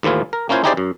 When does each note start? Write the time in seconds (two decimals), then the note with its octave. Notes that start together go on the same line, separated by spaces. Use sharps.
0.03 D#2 A2 E3 E4 F4
0.33 A#4
0.49 A#3 C#4 E4 F4 C5 G#5
0.64 D#4 E4 G4 G#4 C5 D5
0.77 F#2